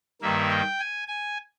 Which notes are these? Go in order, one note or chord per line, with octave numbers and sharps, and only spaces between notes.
G2 D#3 A#3 E5
G5
G#5
G#5